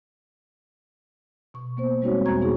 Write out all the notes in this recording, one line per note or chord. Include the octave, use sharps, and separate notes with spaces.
B2 C#6
A#3 B3 C5
G3 G#3 C4 D#4 F#4 C#5
E2 B2 F#4 A#5 C#6 G#6
B3 D#4 F#4 G#4